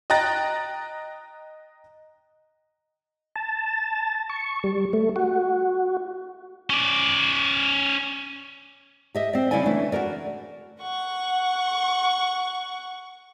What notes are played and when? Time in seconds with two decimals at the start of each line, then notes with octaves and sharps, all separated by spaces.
0.10 D#5 G5 A#5 F#6 A6 A#6
3.36 A5
4.30 C#6
4.64 G3
4.93 A3
5.16 F#4
6.70 C#4 D5
9.15 G4 D#5 E5
9.33 C4 D5
9.51 C#3 G3 E4 F4 D5 G#5
9.63 E3 A3 C#4 D4
9.92 F#4 G4 A#4 D5
10.82 F#5 C#6